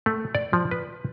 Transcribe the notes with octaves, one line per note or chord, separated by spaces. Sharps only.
A3
D5
F3
B4